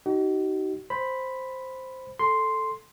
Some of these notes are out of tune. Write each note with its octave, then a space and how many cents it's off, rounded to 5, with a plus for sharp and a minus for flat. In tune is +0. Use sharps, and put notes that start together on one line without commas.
D#4 +0 F#4 +45
C5 +0 B5 +0
A4 +0 C6 +0